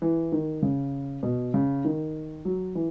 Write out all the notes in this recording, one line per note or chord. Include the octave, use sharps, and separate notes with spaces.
E3
D#3
C#3
B2
C#3
D#3
F#3
E3